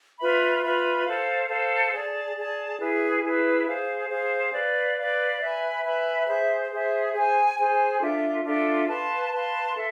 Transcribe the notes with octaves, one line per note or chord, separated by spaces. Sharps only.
F4 B4 E5 B5
F4 B4 E5 B5
A4 C5 F5
A4 C5 F5
G#4 D5 A5
G#4 D5 A5
E4 G#4 B4
E4 G#4 B4
G#4 C5 F5
G#4 C5 F5
B4 D5 F5
B4 D5 F5
B4 E5 G#5 B5
B4 E5 G#5 B5
G#4 C5 E5
G#4 C5 E5
G#4 C5 G#5
G#4 C5 G#5
D4 F4 A4 E5
D4 F4 A4 E5
B4 F5 A5 C6
B4 F5 A5 C6
A4 E5